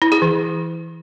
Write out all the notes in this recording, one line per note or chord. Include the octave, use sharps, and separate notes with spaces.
E4
G#4
E3